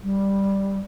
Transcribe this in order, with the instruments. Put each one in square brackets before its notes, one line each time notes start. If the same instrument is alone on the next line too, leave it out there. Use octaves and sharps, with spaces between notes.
[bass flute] G3